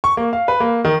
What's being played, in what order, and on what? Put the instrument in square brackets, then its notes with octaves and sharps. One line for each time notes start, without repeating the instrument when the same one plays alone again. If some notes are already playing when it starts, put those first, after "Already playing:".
[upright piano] C#6
A#3
F5
B4
A#3
D#3